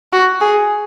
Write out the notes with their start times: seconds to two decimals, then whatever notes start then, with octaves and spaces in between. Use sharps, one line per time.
0.13 F#4
0.41 G#4